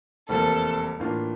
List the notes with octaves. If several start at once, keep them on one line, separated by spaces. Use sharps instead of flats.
F1 E2 C3 G3 A#3 A4
A2 E3 A#3 D4 F4